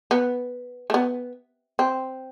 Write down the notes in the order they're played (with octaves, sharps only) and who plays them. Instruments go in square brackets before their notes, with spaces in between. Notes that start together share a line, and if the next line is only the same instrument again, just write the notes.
[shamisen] B3
A3
B3
C4